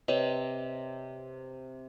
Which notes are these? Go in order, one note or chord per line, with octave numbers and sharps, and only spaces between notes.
C3 B4 C#5 D#5